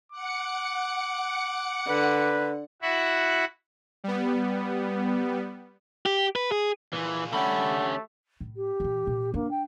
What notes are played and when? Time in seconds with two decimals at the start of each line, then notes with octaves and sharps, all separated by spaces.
0.12 F#5 D6 C#7
1.89 D3 B4
2.82 E4 F#4 E5 F#5
4.04 G3 B3
6.06 G4
6.36 B4
6.52 G#4
6.93 A#2 E3 G#4
7.33 D3 A3 C#4 G4 F#5 B5
8.41 A2
8.57 G4
8.80 A#2 E3
9.07 A#2
9.34 A#3 D4
9.51 G5